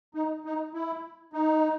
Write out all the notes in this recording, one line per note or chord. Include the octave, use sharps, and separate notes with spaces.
D#4
D#4
E4
D#4